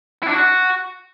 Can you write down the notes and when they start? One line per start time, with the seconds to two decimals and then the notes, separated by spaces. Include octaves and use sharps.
0.23 E4
0.28 D4
0.33 F#4